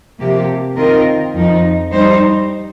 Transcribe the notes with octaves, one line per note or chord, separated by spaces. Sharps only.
C3 F3 A#3 G4
D#3 C4 F4 A#4 D#5
F2 F3 D#4
G3 D#4 C5